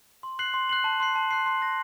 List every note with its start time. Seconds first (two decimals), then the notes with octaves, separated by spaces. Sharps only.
0.23 C6
0.39 F#6 C7 F#7
0.54 C6
0.69 F#6 C7 F#7
0.84 A5
1.00 C6 F#6 C7
1.16 A5
1.31 C6 F#6 C7
1.46 C6
1.62 F#6 A#6